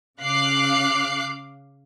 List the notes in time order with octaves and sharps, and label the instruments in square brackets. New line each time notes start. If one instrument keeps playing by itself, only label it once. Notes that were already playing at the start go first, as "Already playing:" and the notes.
[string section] C#3 F5 D6 F#6 C7